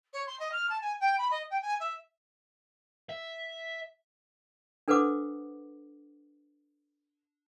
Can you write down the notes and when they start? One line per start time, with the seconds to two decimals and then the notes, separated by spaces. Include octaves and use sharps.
0.13 C#5
0.26 C6
0.39 D#5
0.52 F6
0.69 A5
0.81 G#5
1.00 G5
1.18 B5
1.31 D#5
1.50 G5
1.62 G#5
1.80 E5
3.09 E5
4.88 D4 A4 B4 C5 F#5 D6